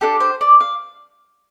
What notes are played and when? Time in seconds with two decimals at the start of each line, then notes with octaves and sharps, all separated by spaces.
0.01 D4 G4 A4
0.20 C5
0.41 D5
0.61 F5